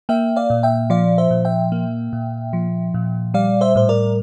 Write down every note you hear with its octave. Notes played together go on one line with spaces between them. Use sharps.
A#3 E5 G5
D5 F5
A#2
E5 G5
F3 D5 F5
C5 E5
A#2
E5 G5
A#3
A#2
F3
A#2
G3 D5 F5
C5 E5
A2 C5
A#4 D5